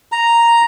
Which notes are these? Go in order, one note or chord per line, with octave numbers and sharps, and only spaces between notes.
A#5